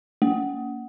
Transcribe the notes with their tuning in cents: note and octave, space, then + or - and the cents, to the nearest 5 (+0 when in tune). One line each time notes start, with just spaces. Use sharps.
A#3 -10